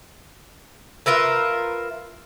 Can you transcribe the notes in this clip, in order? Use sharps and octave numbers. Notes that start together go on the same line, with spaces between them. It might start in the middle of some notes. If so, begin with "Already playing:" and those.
F4 A#4 B4 E5